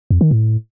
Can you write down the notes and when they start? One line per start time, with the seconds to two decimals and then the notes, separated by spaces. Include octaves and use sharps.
0.10 F2
0.21 D#3
0.31 A2